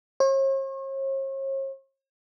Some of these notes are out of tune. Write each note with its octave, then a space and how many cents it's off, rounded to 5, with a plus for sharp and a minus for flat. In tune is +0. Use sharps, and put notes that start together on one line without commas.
C#5 -45